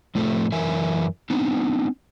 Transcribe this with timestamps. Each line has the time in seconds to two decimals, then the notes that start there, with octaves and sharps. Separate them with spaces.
0.15 F2 A2 F3 A3 C4
0.52 F#2 E3 A#4 E5 G#5
1.30 B3 C4 D4 D#4